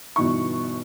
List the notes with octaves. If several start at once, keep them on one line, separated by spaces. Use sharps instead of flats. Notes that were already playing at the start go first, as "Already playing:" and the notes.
G1 B2 E3 D#4 C#6